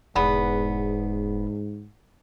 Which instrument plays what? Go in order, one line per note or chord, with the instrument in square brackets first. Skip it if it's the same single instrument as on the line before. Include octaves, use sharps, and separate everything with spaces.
[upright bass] E1 [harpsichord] E2 [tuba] G#2 [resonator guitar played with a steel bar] B3